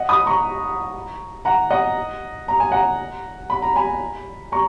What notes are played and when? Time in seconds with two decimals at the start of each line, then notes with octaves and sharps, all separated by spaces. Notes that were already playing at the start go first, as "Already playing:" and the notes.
Already playing: D#5 F#5
0.09 B5 D#6
0.26 A#5 C#6
1.45 F#5 A#5
1.71 D#5 F#5
2.48 A#5
2.60 G#5
2.72 F#5 A#5
3.50 B5
3.62 A#5
3.76 G#5 B5
4.52 A#5 C#6